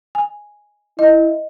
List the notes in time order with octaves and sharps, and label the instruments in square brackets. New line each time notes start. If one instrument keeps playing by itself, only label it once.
[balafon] G#5
[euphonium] E4 [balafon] D#5